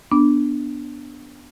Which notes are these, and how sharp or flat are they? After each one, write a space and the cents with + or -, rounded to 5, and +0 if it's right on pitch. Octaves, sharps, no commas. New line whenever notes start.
B3 +0 D4 -5